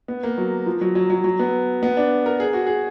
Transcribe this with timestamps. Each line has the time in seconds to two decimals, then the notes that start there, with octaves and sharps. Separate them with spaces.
0.08 B3
0.23 A#3
0.38 F#3
0.66 F3
0.81 F#3
0.95 F#3
1.10 F#3
1.24 F#3
1.39 B3
1.83 B3
1.97 D4
2.26 A#4
2.40 G#4
2.53 F#4
2.67 G#4